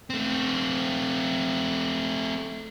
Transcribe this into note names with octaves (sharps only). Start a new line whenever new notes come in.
A3 C4